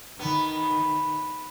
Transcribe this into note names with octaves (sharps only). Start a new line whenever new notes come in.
D#3 B3